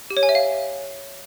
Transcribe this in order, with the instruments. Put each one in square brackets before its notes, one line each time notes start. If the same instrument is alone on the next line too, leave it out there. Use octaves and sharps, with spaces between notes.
[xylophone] G4
C#5
G#5
E5
F5